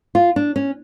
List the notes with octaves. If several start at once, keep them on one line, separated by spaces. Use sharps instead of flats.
F4
D4
C#4